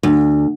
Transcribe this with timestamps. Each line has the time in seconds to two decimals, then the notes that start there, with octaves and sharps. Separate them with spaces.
0.03 D2